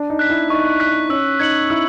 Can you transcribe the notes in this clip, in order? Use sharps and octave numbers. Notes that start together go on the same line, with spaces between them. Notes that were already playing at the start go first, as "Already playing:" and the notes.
Already playing: D4
D#4
F#6 B6
E4
D#4 C#6
F#6 B6
C#4 E6
D#4 G#6 C#7 F#7
E4 E6